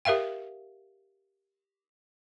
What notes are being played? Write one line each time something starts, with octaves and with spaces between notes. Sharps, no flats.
G4 A#4 E5 F5 G5